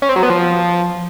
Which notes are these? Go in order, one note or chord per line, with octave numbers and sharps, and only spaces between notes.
C#4
C4
F#3
B3
F3